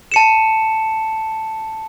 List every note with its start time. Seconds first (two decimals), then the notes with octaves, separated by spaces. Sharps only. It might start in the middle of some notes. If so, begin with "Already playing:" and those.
0.12 A5 C#7 E7